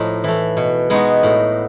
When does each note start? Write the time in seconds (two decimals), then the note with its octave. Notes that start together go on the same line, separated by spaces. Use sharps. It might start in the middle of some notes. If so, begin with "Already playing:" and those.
Already playing: A2 F3 D#4
0.24 E3 A3
0.57 B2
0.90 G#3 B3 D#4 F#4
1.23 A2